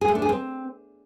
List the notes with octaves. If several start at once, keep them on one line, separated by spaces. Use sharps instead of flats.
G#4
A3
D4
G#4
C4